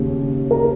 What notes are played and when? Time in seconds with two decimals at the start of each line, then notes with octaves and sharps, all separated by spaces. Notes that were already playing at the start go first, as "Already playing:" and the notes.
Already playing: D#2 C#3
0.51 A#4